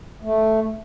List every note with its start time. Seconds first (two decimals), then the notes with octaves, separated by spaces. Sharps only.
0.22 A3